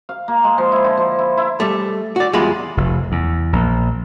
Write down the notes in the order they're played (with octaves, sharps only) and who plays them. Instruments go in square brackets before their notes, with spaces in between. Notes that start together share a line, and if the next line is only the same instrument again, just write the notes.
[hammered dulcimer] F5
A#3
G#3
F3
E4
D3
F3
E4
E4
[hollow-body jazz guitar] G3 A3
F#4 D5
E2 G3 G#3 F4 G#4 B5
[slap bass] F1
E2
A#1